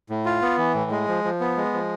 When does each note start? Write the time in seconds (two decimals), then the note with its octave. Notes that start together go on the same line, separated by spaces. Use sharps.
0.10 A2
0.25 F4
0.41 B3
0.58 E3
0.74 A2
0.91 G#3
1.08 F3
1.24 F3
1.40 B3
1.57 G#3
1.74 F3